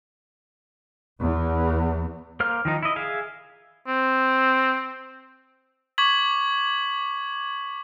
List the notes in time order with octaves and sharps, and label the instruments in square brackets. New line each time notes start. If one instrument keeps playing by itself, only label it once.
[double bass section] E2
[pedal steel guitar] A#3 C5 F6
D#3 F3 D#4
E4 D#5
G#4 E5 F5
[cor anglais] C4
[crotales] C#6 D6 G#6 B6 F#7